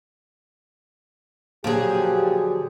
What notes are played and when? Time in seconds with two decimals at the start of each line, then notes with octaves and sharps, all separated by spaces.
1.64 A#2 D3 F3 F#3 G4 G#4